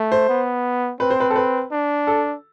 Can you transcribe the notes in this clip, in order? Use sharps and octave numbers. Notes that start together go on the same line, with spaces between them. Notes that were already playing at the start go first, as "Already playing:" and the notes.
Already playing: A3
C5
B3
C4 B4
C5
B4
A4
B4
D4
A4